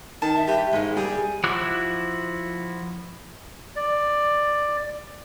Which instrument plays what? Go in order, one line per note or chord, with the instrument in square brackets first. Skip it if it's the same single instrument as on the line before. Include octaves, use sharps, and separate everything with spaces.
[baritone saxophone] D#3 [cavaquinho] A5
[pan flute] E5
[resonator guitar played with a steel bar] G2 [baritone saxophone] G4
[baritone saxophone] G#2 [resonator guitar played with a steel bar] G#3 A#3
[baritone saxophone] G3 [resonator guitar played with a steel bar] G#4
[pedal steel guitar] F3 E4 F#4 D6 F#6
[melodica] D5